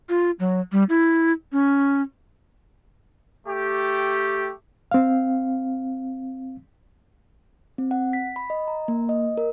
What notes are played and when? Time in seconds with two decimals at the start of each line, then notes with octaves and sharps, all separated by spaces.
0.09 F4
0.39 F#3
0.72 G3
0.89 E4
1.52 C#4
3.46 A3 G4
4.91 C4 F5
7.78 C4
7.91 F#5
8.13 B6
8.36 B5
8.50 D#5
8.68 A#5
8.88 A#3
9.09 D#5
9.37 A#4